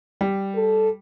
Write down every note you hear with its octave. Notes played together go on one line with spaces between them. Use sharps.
G3
A4